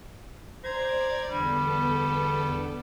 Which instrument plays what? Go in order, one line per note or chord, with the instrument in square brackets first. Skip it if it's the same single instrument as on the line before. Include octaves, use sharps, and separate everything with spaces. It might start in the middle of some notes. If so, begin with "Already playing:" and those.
[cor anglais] C5 [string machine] D5 [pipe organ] A#5 G#6
[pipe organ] E2 D3 [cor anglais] G3 [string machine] B3 A4